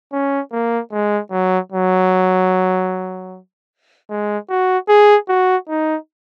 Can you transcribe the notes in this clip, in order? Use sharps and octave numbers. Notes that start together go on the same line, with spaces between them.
C#4
A#3
G#3
F#3
F#3
G#3
F#4
G#4
F#4
D#4